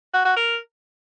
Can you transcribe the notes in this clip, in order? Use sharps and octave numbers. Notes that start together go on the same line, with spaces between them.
F#4
F#4
A#4